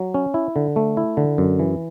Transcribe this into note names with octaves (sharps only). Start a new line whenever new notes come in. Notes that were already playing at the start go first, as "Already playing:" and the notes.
Already playing: F#3
C#4
E4
D3
A3
E4
D3
F#2
E3